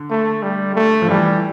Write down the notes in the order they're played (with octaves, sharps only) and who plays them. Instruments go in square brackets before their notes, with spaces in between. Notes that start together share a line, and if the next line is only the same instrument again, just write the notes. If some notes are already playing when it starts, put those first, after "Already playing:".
Already playing: [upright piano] D3
[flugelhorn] A3
G3
A3
[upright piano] F3
[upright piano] E3 [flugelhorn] G3